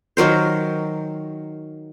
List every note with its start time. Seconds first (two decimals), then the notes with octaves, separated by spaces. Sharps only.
0.17 D#3 F#3 A#4 C5